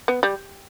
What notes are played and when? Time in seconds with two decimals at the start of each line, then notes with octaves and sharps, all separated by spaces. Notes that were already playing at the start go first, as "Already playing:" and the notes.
0.08 B3
0.23 G3